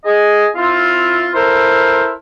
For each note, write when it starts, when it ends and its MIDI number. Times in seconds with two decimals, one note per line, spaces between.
0.05 0.45 68
0.05 0.45 75
0.56 1.28 60
0.56 1.28 64
0.56 1.28 65
1.33 2.10 64
1.33 2.10 69
1.33 2.10 70
1.33 2.10 72